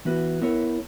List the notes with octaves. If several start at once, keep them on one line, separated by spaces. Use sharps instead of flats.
E3 B3 F#4 B4
B3 E4 A#4 C#5